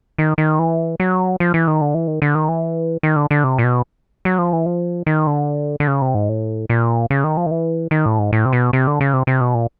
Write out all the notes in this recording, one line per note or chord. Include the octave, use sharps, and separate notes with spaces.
D#3
D#3
E3
F#3
F3
E3
D#3
D3
E3
D#3
D3
D#3
E3
D#3
D3
D3
C3
A#2
B2
F#3
F3
E3
F3
D#3
D3
D3
C#3
C3
G#2
A2
A#2
C#3
D#3
F3
D#3
E3
D#3
A2
G#2
A2
C3
B2
C3
D3
C#3
C3
C3
B2
A#2